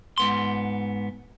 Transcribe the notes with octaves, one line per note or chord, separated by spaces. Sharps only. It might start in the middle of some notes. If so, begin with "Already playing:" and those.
G#2 B3 C6